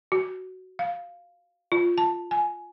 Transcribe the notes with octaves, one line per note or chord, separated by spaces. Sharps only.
F#4
F5
F4
A5
G#5